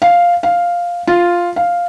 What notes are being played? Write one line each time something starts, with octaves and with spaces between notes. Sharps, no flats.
F5
F5
F4
F5